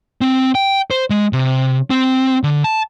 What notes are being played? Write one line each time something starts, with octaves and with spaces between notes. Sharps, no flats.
C4
G5
C5
G#3
C3
C4
D3
A5